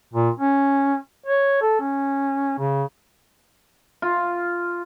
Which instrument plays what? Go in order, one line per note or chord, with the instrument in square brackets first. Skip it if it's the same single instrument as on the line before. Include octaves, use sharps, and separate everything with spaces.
[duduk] A#2
C#4
C#5
A4
C#4
C#3
[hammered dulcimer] F4